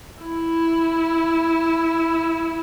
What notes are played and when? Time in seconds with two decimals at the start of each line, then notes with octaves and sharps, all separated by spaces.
0.23 E4